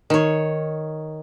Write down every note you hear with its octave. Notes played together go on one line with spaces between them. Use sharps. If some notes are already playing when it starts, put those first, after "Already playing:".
D#3 C#5